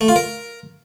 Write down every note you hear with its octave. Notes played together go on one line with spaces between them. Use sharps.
A3
F4
A#4